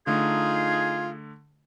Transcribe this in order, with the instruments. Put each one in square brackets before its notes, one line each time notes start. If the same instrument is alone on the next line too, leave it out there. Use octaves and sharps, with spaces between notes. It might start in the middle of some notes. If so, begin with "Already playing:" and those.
[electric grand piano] D3 A3 [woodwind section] D#4 G#4 [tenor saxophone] F4